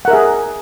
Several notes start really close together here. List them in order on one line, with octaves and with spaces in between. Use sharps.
F#5 A#4 E5 G#4